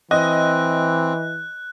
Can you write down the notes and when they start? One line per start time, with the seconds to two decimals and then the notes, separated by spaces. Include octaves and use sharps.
0.11 E3 C4 D#5 F#6